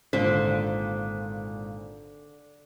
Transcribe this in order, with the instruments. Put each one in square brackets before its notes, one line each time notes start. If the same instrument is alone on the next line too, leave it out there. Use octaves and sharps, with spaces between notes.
[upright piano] G#1 A#2 B6 [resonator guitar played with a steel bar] D3 [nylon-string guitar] C5